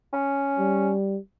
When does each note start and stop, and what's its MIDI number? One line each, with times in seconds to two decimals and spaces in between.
0.13 0.91 61
0.59 1.18 55